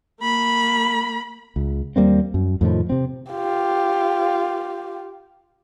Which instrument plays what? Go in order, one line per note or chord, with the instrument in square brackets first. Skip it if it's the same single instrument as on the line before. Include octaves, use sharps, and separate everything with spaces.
[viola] A#3 B5
[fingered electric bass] C#2
D#2 G3 A#3 C4
F#2
F2 A2 D#3 F3
C3 C4
[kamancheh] F4 G4